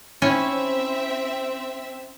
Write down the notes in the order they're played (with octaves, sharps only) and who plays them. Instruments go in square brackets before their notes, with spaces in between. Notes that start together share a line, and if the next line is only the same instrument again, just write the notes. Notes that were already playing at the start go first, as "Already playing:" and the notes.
[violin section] C4 E5 [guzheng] C#4 E4 C#5